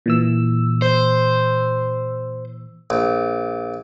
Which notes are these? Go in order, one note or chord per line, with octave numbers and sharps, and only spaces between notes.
A#2 E3 E6
C5
A#1